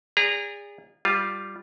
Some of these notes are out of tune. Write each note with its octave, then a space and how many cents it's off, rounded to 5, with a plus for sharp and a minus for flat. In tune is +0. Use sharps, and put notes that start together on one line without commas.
G#4 -30 D5 -25 A#5 +0
G3 +0 F4 +0